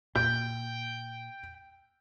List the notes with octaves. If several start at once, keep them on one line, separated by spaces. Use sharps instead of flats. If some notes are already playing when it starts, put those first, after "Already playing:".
A#2 G5 G6